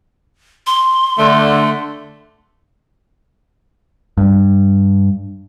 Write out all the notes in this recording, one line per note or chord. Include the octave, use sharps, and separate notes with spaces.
C6
D3 A3
G2